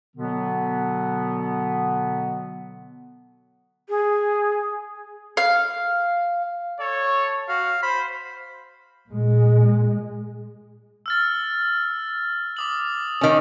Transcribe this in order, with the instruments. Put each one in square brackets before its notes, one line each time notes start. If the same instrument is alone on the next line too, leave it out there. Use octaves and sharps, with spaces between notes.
[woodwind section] B2 D3 F#3 B3
[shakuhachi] G#4
[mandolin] F5
[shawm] A4 [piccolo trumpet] C#5
[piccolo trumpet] F#4 [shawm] F5
[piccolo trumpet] C5 [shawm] B5
[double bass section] A#2 G#3
[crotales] E6 F6 A6
D6 D#6 F#7
[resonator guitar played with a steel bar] D#3 C#4